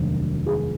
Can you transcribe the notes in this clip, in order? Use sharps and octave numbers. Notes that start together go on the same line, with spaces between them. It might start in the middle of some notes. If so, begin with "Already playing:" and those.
Already playing: F1 D#2 D3 F#3 A#3
G#4